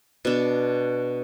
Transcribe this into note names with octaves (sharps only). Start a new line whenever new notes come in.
B2 D4